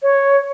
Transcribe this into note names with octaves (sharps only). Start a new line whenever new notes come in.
C#5